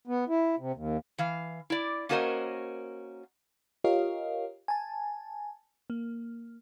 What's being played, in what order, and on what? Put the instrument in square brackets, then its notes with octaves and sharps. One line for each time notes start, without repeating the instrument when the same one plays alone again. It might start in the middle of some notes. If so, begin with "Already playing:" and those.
[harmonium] B3
E4
C3
D#2
[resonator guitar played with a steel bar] E3 F5
E4 D5
A#3 C#4 F#4 A#4 C5 D#5
[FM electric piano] F4 G4 A#4 C#5 D#5 F5
G#5 A5
A#3